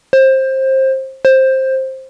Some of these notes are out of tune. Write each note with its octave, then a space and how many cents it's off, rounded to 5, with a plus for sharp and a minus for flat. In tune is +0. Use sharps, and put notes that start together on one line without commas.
C5 +20
C5 +15